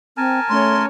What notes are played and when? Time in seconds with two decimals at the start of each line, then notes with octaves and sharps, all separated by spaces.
0.17 C4 A#4 G#5 A5
0.49 A3 C#4 C#5 C6